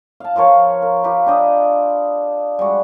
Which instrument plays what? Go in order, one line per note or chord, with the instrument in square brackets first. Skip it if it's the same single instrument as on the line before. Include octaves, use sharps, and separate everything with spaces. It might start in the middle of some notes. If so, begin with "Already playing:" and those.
[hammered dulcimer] F5 A5
F3 F4 A#4 C#5
A#4
F4 G4 A#4 B4
D4 G4 D#5
G3 G#3 F#4